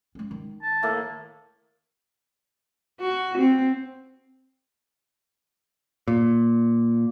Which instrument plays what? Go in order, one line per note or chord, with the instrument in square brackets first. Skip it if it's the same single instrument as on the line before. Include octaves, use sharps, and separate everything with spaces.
[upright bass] G#3 C#4
D#3
[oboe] A5
[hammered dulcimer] A2 A#3
[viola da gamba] F#4
C4
[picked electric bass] A#2